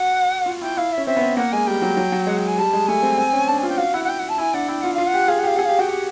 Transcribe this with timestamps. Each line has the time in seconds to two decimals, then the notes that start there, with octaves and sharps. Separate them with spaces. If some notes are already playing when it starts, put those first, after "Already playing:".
Already playing: F#4 F#5
0.46 F4
0.61 E4 G5
0.77 E4 F5
0.92 E5
0.98 C#4
1.06 C4 E5
1.17 B3
1.21 C4
1.37 A#3 F#5
1.52 G#3 G#5
1.67 G3 G5
1.82 F#3
1.97 F#3
2.12 F#3
2.27 G#3 F#5
2.37 G5
2.47 G#5
2.58 G3 A5
2.73 G#3
2.87 A3 G#5
3.03 C4
3.18 C4
3.33 C#4
3.48 D4 A5
3.58 G#5
3.63 F4
3.69 G5
3.78 F#4 F5
3.94 E4 F#5
4.04 F#5
4.08 G5
4.19 F#5
4.29 A5
4.38 E4 G#5
4.54 D4 F#5
4.68 E4 G5
4.82 F4 F#5
4.94 F4 F5
5.06 F#5
5.14 G4
5.28 G#4 F5
5.39 F#5
5.43 G4 F5
5.56 G#4 F#5
5.65 G4 F5
5.79 F#4 G5
5.88 G4 F#5